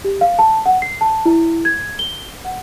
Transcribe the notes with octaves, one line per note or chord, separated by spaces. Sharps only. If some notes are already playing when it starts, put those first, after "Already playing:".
G4
F5
A5
F#5
C7
A5
E4
G#6
G7
F#5